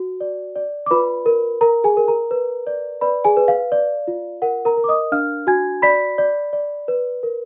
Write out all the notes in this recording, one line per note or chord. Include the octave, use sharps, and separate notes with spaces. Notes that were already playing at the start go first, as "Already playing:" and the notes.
Already playing: F#4
D5
D5
D6
F4 B4 B5
A#4
A#4 A#5
G#4 G#5
A#4
A#4 A#5
B4
D5
B4 D5 B5
G#4 G#5
B4
F5
D5
F4
A#4 F#5
A#4 A#5
A#4
D6
D#5 D#6
D4 F5 F6
F#4 G#5 G#6
D5 B5 B6
D5
D5
B4
A#4